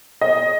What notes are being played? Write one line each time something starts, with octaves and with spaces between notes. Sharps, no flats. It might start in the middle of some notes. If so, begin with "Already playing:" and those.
D#5